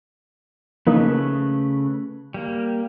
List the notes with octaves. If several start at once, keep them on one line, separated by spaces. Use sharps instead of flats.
C#3 F3 A3 A#3 D#4 B4
G3 A#3